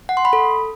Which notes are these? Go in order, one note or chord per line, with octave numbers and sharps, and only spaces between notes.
F#5
C6
B5
A4